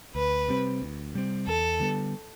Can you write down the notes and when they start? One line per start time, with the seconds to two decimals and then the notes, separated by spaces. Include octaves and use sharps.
0.15 D2 B4
0.48 C3 G3 C4
0.82 D2
1.15 C3 G3 C4
1.46 E2 A4
1.80 D3 G3 B3